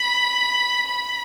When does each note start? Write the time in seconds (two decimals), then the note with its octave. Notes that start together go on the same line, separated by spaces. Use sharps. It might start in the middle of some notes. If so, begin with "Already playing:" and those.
Already playing: B5
0.88 B5